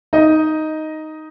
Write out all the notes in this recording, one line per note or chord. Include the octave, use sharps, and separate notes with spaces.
D#4 D#5